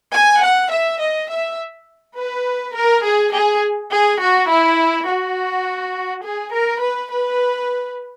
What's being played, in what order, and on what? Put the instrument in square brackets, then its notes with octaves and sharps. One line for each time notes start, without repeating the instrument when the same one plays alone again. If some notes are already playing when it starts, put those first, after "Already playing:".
[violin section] G#5
F#5
E5
D#5
E5
B4
A#4
G#4
G#4
G#4
F#4
E4
F#4
G#4
A#4
B4
B4